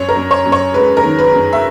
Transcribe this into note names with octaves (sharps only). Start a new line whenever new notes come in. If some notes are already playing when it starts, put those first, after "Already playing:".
Already playing: F#2 C#5
A#4
F#2
C#5
F#2
C#5
G#3 B4
A#4
D#3
B4
F#2
E5